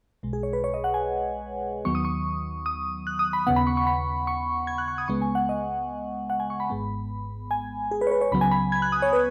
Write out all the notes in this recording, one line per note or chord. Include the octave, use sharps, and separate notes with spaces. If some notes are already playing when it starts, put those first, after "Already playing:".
B1 B2 G#3
G#4
C#5
B4
C#5
D#5
F#5
G#5
D#2 D#3 F#3 B3 C#6
D#6
C#6
D#6
F#6
D#6
B5
D#2 C#3 B3 F#5
B5
C#6
C#6
B5
C#6
G#6
F#6
C#6
D#6
C#2 C#3 G#3 B3 C#6
G#5
F#5
D#5
F#5
G#5
C#6
B5
G#1 G#2 G#3 B3
G#5
G#4
B4
C#5
B4
C#5
C#2 C#3 F#3 B3 B5
G#5
B5
G#6
F#6
D#6
C#5
B4